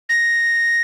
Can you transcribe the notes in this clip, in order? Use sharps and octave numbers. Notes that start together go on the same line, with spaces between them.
A#6